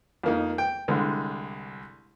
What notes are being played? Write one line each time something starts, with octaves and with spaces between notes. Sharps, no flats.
F2 A#3 D#4
G5
C2 D3 G#3